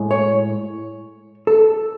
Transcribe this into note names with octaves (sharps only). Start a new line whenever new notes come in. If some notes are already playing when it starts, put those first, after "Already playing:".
Already playing: A2 G#3
C#5
A4